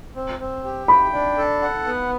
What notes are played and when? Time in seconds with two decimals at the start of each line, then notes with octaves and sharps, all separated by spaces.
0.16 C4
0.40 C4
0.64 G4
0.88 G5 B5
1.13 D4
1.38 A4
1.62 F#5
1.85 B3